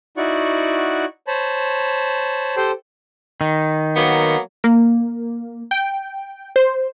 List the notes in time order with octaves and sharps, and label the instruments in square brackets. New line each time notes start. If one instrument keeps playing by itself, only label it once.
[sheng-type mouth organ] D#4 E4 F#4 D5 F#5 C#6
C5 C#5 A5 B5
G4 A4 C5 G5 C6
[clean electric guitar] D#3
[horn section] F#3 A#3 B3
[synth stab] A#3
G5
C5